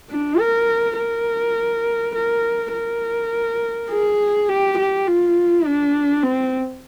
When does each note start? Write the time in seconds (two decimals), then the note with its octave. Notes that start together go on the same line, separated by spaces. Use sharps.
0.10 D4
0.40 A#4
0.97 A#4
2.15 A#4
2.73 A#4
3.91 G#4
4.49 G4
4.78 G4
5.07 F4
5.65 D4
6.23 C4